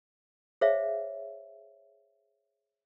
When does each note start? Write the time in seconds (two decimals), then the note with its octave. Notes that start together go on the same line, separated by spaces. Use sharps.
0.61 G#4 C5 C#5 E5 F5